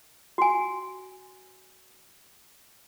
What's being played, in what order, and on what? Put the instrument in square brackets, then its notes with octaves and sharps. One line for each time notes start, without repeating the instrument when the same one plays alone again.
[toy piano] F#4 G#5